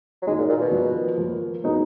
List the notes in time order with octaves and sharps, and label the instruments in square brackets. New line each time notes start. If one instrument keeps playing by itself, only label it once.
[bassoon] F#3
[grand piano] D#3 A#3 D#4 F#4 [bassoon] G#3
[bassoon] A#2
A#2
B2
[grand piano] F3 A#3 F4
F3 A#3 F4
F#3 B3 D#4 G#4